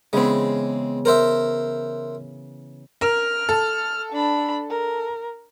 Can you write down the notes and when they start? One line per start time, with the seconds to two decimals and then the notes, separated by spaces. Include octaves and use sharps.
0.13 C#3 E3 G#3 B3 C4
1.05 A#4 C5 E5
3.01 A#4 F6
3.49 A4
4.12 D4 B5
4.70 A#4